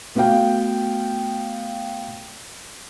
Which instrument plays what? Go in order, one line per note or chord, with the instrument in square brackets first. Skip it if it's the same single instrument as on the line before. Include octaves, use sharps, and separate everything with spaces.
[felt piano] A3 B3 F#4 F5 G5